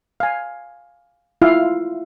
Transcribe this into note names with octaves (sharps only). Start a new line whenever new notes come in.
F5 G#5
E4 F4 E5 F5